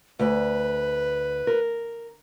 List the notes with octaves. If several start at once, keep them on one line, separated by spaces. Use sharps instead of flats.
D2 B4
A#4